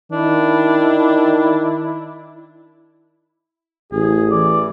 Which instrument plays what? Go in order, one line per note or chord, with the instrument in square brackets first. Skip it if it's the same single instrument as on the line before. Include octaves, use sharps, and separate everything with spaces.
[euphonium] D#3 [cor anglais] D4 [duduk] E4
[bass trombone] A1 [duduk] G#4
[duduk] E3 [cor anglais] D5